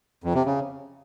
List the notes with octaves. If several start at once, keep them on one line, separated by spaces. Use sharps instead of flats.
F2
C3
C#3